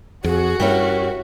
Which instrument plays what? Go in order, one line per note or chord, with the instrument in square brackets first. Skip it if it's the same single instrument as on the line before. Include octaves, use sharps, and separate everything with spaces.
[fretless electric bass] F2 [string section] F#4 [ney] G#4
[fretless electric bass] G2 [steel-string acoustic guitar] C#4 E4 G4 [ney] A#4